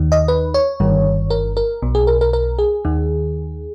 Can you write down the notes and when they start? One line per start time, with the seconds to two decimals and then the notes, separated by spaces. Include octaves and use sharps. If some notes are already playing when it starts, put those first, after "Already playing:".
Already playing: D#2 D#3
0.12 D#5
0.28 B4
0.54 C#5
0.80 G1 G2 D#3
1.30 A#4
1.57 A#4
1.82 B1 B2
1.95 G#4
2.07 A#4
2.21 A#4
2.33 A#4
2.59 G#4
2.85 D#2 D#3